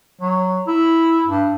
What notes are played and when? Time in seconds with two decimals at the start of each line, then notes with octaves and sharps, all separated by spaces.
0.21 F#3
0.67 E4
1.27 G2